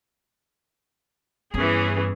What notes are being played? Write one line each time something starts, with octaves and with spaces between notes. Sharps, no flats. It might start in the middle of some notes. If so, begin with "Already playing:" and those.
G2 E3 B3 C#4 G#4